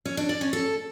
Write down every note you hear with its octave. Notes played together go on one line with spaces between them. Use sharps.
C#4
D4
D5
C#4
A4